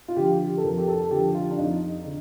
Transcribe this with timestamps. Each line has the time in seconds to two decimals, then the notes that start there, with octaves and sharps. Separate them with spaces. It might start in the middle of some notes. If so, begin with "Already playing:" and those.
0.08 F4
0.16 D3 F3 G4
0.57 A4
0.63 F2 A#4
0.78 G4
0.88 A4
1.11 D3 F3 G4
1.34 F4
1.51 D4
1.58 F2 D#4
2.06 D3